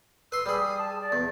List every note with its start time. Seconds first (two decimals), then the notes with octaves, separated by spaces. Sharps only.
0.32 B4 C6 E6
0.46 G3 G#4 B5
0.60 D#6
0.79 A5
1.00 D5
1.12 E2